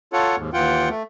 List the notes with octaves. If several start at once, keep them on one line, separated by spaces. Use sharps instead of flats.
F4 A4 C#5 F#5
D#2 G#2
D#2 E3 F4 F#5 G5
A3